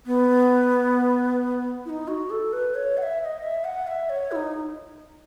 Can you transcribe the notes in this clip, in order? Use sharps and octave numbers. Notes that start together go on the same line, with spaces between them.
B3
E4
D#4
F#4
A4
B4
C#5
F#5
E5
E5
D#5
E5
F#5
E5
C#5
E4
D#4